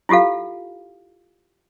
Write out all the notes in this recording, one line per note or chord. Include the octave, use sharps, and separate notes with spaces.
E4 F4 G4 A4 F5